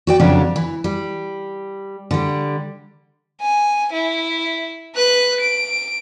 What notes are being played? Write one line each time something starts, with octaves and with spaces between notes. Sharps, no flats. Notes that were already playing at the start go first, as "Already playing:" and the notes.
F#4 D5 G5
F2 C#3 F3 F#3 D4
E3
G3
D3 G3
G#5
E4
B4 F#6
D7